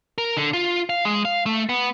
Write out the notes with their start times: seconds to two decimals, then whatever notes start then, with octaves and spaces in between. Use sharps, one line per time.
0.18 A#4
0.37 D3
0.53 F4
0.90 F5
1.05 G#3
1.25 F5
1.46 A3
1.69 B3